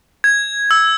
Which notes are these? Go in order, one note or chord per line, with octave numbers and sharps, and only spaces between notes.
G#6
E6